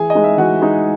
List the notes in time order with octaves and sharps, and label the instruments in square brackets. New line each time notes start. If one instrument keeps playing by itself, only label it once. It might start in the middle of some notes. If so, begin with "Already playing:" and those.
Already playing: [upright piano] E3 G#4 G#5
D#5
G#3 D#4
E5
E3 F#4 F#5
G#3 D#4